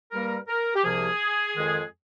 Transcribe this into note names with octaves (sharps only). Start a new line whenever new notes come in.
G2 G3 A#3 A#4
A#4
G4
C2 C3 F3 A#3 G#4
F2 D#3 G#3